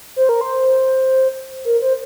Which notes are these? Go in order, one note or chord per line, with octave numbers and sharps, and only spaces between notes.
C5
A#4
C5
A#4
C5